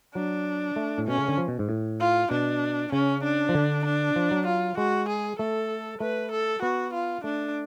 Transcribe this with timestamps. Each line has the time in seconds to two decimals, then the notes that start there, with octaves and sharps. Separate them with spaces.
0.15 F#3 D4
0.76 A3
0.98 A2
1.07 B2 C#4
1.18 C#3
1.28 D3
1.38 F3
1.48 B2
1.59 G#2
1.69 A2
2.00 F4
2.31 B2 D4
2.92 C#3 C#4
3.24 D4
3.49 F3
3.55 D3
3.85 D4
4.16 F3
4.31 F#3
4.47 F4
4.77 G#3 F#4
5.09 G#4
5.39 A3 A4
6.00 A3 B4
6.31 A4
6.62 B3 F#4
6.93 F4
7.24 A3 D4